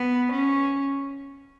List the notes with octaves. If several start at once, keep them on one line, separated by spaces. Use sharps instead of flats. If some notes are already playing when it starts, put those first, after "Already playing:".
Already playing: B3
C#4